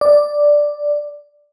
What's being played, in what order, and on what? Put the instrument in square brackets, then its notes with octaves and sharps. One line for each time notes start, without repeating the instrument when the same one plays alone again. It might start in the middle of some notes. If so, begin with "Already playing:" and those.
[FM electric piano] D5